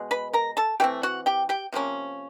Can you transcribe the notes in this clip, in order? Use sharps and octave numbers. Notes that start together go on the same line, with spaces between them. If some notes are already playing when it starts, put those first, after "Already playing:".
Already playing: B2 G#3
B4 B5
A#4 A#5
A4 A5
E3 A3 C4 G4 G5
F#4 F#5
G4 G5
G4 G5
C3 F3 A#3 C#4